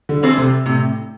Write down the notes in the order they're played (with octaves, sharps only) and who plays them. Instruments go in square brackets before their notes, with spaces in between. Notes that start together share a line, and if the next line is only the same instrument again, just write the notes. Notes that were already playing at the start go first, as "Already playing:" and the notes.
[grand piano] D3
[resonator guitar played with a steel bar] E3 C4 A4 C5
[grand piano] C3
[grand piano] A2 [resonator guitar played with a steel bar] C3